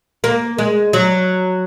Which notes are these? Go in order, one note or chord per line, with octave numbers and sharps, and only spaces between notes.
A#3
G#3
F#3